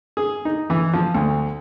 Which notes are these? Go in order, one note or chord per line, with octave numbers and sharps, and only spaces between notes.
G#4
D#4
E3
F3
D2